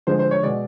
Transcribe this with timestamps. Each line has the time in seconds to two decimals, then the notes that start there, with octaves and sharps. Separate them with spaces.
0.07 D3 F3 G#3 C5
0.19 C5
0.31 C#5
0.43 B2 G#3 D5